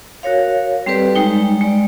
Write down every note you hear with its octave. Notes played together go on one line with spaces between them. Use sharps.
F#4 A#4 C#5 F5
G3 C4 G4 A4 B4 D5
G3 G#3 D#4 G5
G#3 D5